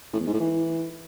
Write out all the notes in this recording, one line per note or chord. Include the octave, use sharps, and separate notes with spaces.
A2
E2
G#2
A2
E3